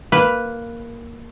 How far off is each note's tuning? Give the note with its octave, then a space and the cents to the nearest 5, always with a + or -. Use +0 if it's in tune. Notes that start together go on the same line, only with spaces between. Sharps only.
A#3 +0 B4 +0